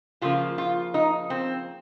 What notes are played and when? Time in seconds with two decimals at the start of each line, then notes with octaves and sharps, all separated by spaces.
0.21 C#3 F3 A#3 F4
0.58 F4
0.94 D#4
1.30 C4